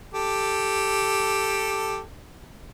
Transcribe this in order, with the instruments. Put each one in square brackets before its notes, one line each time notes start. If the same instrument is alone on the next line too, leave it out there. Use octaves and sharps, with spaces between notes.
[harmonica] G4 A4